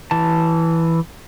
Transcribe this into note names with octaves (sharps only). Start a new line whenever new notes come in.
E3 A5